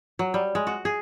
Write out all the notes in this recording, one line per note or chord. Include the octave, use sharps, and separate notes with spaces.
F#3
G3
G#3
F#4
G#4